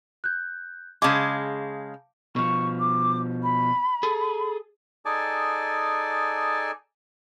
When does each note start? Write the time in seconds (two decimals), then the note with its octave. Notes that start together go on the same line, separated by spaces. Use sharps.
0.24 F#6 G6
1.02 C#3 G#3 F5 A5 D6 G6
2.36 B2 F3 C#6
2.80 D6
3.43 B5
4.03 G#4 A4
5.05 D#4 G#4 A4 D5 G#5 A5